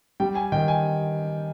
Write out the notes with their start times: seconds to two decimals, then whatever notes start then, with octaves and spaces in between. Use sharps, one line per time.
0.20 G3 G5
0.35 G#5
0.52 D#3 G5
0.68 G#5